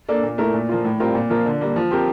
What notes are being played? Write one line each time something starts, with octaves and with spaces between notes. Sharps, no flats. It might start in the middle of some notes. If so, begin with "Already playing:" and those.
A#3 D4 A4
A#2
A3 E4 A#4
A#2
F3 A#3 F4
A2
G3 C4 F4 A#4
A#2
F3 A#3 F4 A#4
D3
G3 A#3
F3
C4 G4 A#4